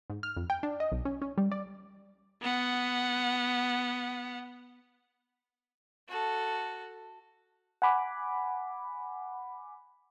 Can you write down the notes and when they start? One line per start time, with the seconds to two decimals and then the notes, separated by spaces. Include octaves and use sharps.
0.10 G#2
0.23 F6
0.37 F2
0.50 G5
0.63 D4
0.80 D#5
0.92 B1
1.05 C#4
1.22 C#4
1.38 G3
1.52 D5
2.42 B3 F#5
6.08 F#4 A4
7.82 F#5 G#5 B5 D6